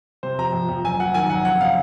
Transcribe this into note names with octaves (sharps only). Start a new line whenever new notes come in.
C3 C5
F1 A#5
F2
F2
F#1 G#5
F#1 F#5
D#3 G#5
F#1 F#5
F1 F#5
C#3 F5